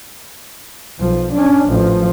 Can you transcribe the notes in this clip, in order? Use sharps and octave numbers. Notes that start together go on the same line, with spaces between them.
B1 F3
C#4 D4
A1 F3